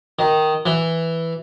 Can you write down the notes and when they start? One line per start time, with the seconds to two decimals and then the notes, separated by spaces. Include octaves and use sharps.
0.19 D#3
0.66 E3